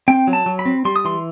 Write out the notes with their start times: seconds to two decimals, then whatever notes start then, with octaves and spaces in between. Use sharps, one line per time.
0.08 C4 G5
0.27 F#3
0.33 A5
0.46 F#3
0.59 B5
0.65 C4
0.85 G3 C6
0.96 D#6
1.05 E3 C6